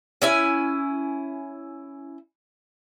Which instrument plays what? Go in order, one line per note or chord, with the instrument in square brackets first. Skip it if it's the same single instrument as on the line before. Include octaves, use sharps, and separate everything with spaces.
[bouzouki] C#4 E4 G#5